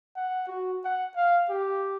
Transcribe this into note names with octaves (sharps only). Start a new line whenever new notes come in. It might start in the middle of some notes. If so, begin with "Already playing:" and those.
F#5
F#4
F#5
F5
G4